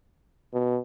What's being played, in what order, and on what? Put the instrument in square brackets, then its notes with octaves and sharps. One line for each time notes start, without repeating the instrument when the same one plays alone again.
[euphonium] B2